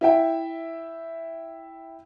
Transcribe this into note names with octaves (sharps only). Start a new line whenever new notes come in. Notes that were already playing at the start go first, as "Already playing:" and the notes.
E4 E5 G5